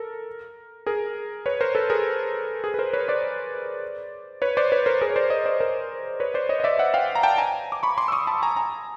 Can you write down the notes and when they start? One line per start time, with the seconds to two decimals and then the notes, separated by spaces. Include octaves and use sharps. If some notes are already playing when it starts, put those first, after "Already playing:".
Already playing: A4 A#4
0.86 G#4 A#4
1.46 B4 C#5
1.61 A#4 C5
1.75 A4 B4
1.90 G#4 A#4
2.64 G#4
2.74 B4
2.79 A#4 C5
2.93 B4 C#5
3.08 C5 D5
4.42 B4 C#5
4.57 C5 D5
4.72 B4 C#5
4.86 A#4 C5
5.01 G#4 A#4
5.10 C#5
5.16 C5 D5
5.30 C#5 D#5
5.46 C5 D5
5.60 A#4 C5
6.20 B4 C#5
6.34 C5 D5
6.49 C#5 D#5
6.60 D#5
6.64 D5 E5
6.79 E5 F#5
6.94 F5 G5
7.15 A#5
7.23 G5 A5
7.38 G#5 A#5
7.72 D6
7.83 B5 C#6
7.98 C6 D6
8.08 E6
8.12 C#6 D#6
8.27 A5 B5
8.42 G#5 A#5
8.56 G#5 A#5